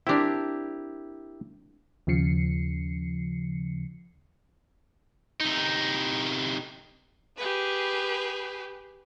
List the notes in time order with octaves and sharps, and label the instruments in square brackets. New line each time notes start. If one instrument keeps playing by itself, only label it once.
[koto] C4 D4 [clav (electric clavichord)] E4 G4 A#4
[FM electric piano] D#2 C#3 F3 C7 C#7
[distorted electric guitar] C3 D#4
[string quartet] G4 G#4 B4